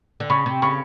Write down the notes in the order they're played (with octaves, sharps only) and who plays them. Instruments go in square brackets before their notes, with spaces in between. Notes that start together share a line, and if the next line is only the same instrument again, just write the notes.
[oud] D3
[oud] C#3 [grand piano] B5 C#6
[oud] C3
[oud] C#3 [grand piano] B5 C#6